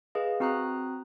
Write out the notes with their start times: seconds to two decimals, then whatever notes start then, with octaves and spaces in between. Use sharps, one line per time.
0.15 G#4 B4 D#5 F5
0.40 C4 F#4 A#5 D#6 F#6